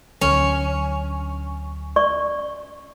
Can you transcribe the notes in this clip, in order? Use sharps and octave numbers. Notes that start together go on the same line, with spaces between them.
D2 D3 F#3 C#4
D5 C#6